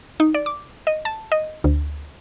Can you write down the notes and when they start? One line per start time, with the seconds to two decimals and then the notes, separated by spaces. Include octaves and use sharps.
0.20 D#4
0.34 D5
0.46 D6
0.87 D#5
1.05 A5
1.32 D#5
1.64 D2